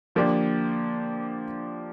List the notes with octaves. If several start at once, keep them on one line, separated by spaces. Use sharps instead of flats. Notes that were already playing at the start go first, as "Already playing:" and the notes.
D3 F3 A#3 D4 G4